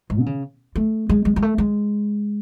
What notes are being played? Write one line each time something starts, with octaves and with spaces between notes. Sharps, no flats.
G#2
D3
C#3
A3
G#3
G#3
G#3
A3
G#3